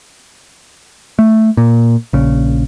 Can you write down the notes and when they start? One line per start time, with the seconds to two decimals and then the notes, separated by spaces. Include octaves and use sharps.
1.19 A3
1.57 A#2
2.13 A#1 C#3